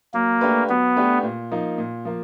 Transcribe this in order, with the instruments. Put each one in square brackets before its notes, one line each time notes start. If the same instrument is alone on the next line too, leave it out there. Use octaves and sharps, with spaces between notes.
[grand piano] F#3 [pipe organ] A#3
[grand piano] A3 D4 G4 B4
[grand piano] F#3 [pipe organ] B3
[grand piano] A3 D4 G4 B4
A#2
F3 A#3 D#4
A#2
F3 A#3